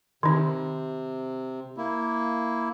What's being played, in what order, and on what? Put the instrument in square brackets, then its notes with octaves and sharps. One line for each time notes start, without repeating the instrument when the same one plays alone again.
[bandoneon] C3 [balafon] D#3 D#4
[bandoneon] A#3 E4